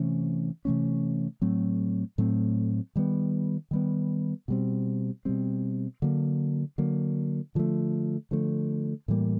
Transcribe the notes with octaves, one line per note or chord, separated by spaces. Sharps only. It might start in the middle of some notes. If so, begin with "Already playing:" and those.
Already playing: C3 E3 A3 C#4
C3 E3 A3 C#4
A2 F#3 A3 C4
A2 F#3 A3 C4
D#3 G3 B3
D#3 G3 B3
B2 G3 C4
B2 G3 C4
D3 F#3 A#3
D3 F#3 A#3
D3 F3 A3
D3 F3 A3
A2 E3 G3 A#3